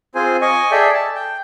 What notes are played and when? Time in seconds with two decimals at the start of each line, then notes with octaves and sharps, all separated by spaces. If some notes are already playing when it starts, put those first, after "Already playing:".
0.15 C4 F4 G#4 C5 G#5
0.41 D#5 G#5 C#6
0.71 G#4 A4 D5 E5 G5
0.93 A5
1.15 G5